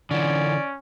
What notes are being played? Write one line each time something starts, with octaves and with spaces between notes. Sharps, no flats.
D3 E3 C#4 D5